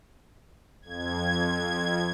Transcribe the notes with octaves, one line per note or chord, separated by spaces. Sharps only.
F2 G#6